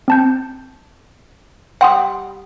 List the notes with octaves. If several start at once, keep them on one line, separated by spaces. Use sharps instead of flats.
C4 A5 G6
G3 F#5 G5 C6 D#6